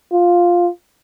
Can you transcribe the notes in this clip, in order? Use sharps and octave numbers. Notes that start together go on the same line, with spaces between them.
F4